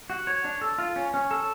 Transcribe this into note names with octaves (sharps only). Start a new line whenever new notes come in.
F#4
C#5
D4
A4
F4
C#4
C#4
A4